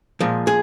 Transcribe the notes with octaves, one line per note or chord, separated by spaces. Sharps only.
A#2 F3 G#3
G#4